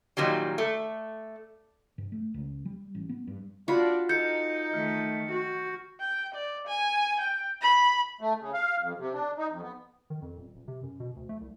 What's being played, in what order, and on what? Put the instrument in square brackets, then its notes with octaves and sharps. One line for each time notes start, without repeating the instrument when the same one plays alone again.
[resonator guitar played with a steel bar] A#2 D#3 F#3 G3
A3
[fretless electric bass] G2
A3
C#2
G3
A1
B3
G2
[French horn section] D4 [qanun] F4 F#4 B5
[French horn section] D#4 [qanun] A4 [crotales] G6 C#7
[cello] D#3 A3 [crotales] F6
[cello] F#4
[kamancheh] G5
D5
G#5
G5
B5
[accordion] A3
C#3
F5
F2
C3
D4
D#4
F2
B3
[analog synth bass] D#3
F2
D#1
D#1
C3
F#2
B2
D2
A3
C2